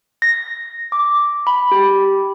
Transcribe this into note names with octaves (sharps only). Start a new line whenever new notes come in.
A#6
D6
B5
G4